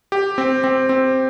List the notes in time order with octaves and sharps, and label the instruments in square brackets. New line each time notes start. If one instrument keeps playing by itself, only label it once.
[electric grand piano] G4
C4
C4
C4